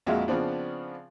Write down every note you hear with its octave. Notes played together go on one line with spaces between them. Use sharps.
A#1 F2 G#3 A#3 F#4 E5
C#3 F3 B3 C4 D4